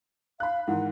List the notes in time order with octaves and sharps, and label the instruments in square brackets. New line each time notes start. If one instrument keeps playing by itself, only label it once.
[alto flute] F5 [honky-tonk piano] B5 F#6
[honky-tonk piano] G#2 D#3 E3 [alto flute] F#5